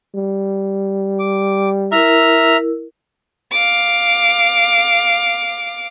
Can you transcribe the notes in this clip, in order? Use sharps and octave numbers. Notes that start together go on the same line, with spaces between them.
G3
D6
E4 A#4 E5 A#5 F6
F5 D6